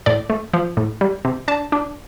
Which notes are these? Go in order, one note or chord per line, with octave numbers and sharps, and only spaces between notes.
A2 D5
A3
F3
A2
G3
C3
D4 A5
D4